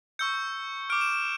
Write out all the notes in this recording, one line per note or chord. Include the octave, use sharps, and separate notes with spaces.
C#6 E6 G6 C#7
D6 F6 D7
E7
E7